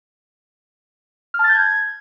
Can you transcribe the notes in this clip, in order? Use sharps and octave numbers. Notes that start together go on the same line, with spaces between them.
F6
A5
A6
G6
G#6